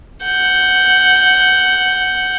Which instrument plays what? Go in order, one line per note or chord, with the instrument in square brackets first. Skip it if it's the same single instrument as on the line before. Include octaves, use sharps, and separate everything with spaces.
[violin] F#5 G6